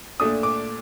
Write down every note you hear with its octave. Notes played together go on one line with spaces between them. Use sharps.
A#2 A3 D4 D#6
D6